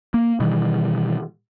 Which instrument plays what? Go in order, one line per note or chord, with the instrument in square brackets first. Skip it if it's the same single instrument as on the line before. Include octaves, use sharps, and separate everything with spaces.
[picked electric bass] A#3
B2 D#3 E3 G3